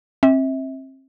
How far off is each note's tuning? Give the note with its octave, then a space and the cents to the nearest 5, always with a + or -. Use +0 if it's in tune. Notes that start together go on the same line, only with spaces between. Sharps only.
C4 +35 E5 -30